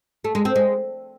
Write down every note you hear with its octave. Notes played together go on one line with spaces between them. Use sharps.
A3
G#3
C4
G#3